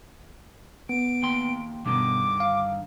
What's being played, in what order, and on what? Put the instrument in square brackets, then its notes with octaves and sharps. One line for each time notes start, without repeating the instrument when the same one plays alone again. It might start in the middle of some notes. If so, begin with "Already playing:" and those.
[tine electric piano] B3 [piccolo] D7
[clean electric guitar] D#2 G5 C6
[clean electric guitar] G2 D3 D#3 [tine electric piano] B2 B3 [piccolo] D6
[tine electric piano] F5